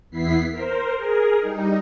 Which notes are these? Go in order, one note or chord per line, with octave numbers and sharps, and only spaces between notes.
E2 B3 E4 B6 C7
A#4 C5
G#4 A#4
G3 D#4